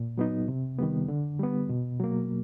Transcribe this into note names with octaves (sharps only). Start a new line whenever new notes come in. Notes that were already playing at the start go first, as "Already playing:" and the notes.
Already playing: A#2
F#3 B3 D#4
C3
D#3 G3 B3
D3
G3 B3
B2
F#3 A#3